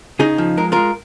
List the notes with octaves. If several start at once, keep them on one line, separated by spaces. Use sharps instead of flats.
C#3 D#4 G#4
F3
G#3 A#4
G#3 F4 A#4